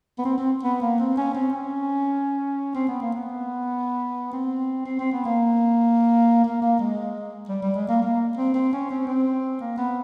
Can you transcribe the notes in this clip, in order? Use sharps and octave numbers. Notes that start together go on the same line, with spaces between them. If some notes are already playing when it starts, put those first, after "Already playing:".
B3
C4
C4
B3
A#3
C4
C#4
C4
C#4
C4
B3
A#3
B3
C4
C4
C4
B3
A#3
A#3
A#3
G#3
G3
G3
G#3
A#3
A#3
C4
C4
C#4
C4
C4
A#3
B3